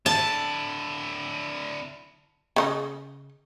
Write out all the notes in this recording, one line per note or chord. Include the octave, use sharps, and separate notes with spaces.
D3 E4 A5
C#3 F#4 D#5